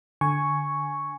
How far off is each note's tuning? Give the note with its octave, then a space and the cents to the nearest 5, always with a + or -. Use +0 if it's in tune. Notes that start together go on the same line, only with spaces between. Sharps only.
D3 +0 G#5 +5 C#6 +0